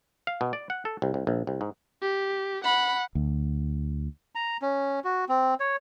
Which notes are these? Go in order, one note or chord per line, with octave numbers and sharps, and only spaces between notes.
F5
B2
D5
F#5
A4
C2
C2
A#1
C2
G#2
G4
F#5 B5
D2
A#5
C#4
F#4
C4
C#5